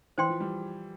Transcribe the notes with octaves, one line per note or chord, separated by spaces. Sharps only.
E3 C5 G5 C6
F3
G3